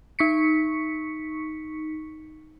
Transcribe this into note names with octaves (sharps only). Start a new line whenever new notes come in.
D#4 C#6 B6 C#7